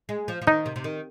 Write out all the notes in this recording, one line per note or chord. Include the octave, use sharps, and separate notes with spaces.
G#3
F3
F3
D#3 D#4
C3
C3
D#3